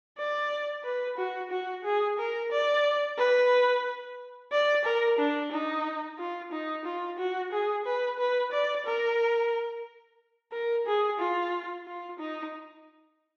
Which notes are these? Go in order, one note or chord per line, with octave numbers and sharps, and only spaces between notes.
D5
B4
F#4
F#4
G#4
A#4
D5
B4
D5
A#4
D4
D#4
F4
D#4
F4
F#4
G#4
B4
B4
D5
A#4
A#4
G#4
F4
F4
D#4